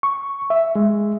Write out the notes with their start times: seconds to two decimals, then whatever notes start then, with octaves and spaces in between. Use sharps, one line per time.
0.03 C#6
0.50 E5
0.75 G#3